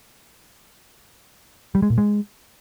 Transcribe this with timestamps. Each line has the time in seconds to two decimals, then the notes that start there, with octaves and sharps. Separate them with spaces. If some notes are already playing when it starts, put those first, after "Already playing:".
1.75 G3
1.82 G#3
1.90 A#2
1.98 G#3